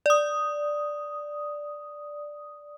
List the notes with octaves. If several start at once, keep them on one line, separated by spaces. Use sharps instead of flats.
D5 D#6